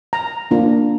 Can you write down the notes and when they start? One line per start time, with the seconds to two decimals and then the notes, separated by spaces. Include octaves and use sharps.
0.13 A#5
0.51 A#3 D4 F4